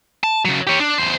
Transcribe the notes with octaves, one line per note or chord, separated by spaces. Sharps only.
A5
C#3 F#3
G4 C#5
D4
E2 C5